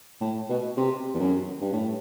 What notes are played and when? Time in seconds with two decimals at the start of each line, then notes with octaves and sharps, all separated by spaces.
0.21 A2
0.49 B2
0.77 C3
1.14 E2
1.19 F#2
1.61 G2
1.73 A2